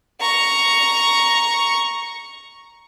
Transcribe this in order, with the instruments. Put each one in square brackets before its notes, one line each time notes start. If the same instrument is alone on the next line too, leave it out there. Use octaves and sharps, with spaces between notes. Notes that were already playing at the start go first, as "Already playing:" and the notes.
[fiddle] A#5 C#6